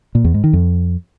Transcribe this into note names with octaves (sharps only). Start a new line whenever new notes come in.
A#2
E2
G#2
D#3
F2